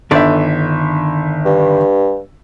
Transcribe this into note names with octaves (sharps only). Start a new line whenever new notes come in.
G1 D3 D#3 D5 E5
G2